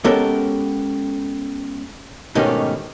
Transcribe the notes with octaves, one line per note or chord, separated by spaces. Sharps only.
G#3 B3 C#4 G4 A4 A#4
G#2 B2 D#3 A3 C#4 G4